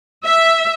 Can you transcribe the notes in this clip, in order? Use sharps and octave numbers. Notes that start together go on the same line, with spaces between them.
E5